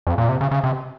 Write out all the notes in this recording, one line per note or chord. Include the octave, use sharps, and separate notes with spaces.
F2
A#2
C3
C#3
C#3
C3